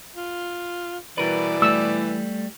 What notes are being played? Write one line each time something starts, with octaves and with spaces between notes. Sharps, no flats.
F4
B2 E3 G3 A#4 B4 D5
G3 A3 E6